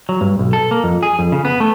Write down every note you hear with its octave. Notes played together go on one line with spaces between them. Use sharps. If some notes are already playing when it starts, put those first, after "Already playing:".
F#3
G2
B1
A4
A#3
F2
G#4
F2
C#3
B3
A3